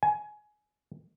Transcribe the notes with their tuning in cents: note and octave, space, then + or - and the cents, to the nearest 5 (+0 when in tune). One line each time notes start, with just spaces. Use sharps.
G#5 +20